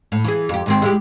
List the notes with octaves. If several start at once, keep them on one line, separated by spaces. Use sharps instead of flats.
A2
E3 G#4
F2 G4
G#2 D#3 C4
G#3 E4 G4